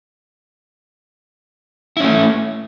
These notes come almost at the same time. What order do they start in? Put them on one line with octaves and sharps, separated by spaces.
E4 C#4 A3